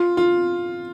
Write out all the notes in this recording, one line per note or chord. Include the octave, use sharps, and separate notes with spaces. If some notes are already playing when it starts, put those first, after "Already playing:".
Already playing: F4
F4